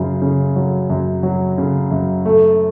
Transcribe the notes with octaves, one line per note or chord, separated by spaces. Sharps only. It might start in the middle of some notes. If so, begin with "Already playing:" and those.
Already playing: F#2 C#3
C#3
F#3
F#2
F#3
C#3
F#2
A3